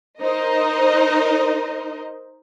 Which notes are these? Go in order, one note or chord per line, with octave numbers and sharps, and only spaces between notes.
D#4 A#4 C5 D#5